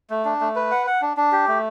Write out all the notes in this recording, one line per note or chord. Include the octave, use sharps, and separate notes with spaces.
A3
D4
A3
B4
F#5
F#5
D4
D4
G4
A3